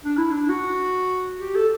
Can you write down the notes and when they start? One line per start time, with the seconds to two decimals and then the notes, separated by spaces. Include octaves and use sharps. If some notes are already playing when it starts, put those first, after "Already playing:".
0.04 D4
0.17 E4
0.31 D4
0.49 F#4
1.40 G4
1.55 A4